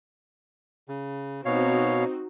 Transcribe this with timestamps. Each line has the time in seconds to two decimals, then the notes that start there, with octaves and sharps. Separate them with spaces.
0.88 C#3
1.45 B2 C4 D#4 F#4 C#5 F5